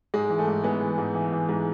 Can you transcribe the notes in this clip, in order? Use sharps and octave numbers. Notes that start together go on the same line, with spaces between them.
G#2 G#3
E3
A3
G#2
E3 G#3 B3
E3
G#2
E3
E3
G#2